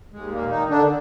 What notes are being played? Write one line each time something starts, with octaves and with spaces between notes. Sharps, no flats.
D#2 G#3
A#2 A#3
D#3 D#4
D3 D4